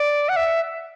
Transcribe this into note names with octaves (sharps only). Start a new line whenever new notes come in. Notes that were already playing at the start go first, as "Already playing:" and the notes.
Already playing: D5
F#5
E5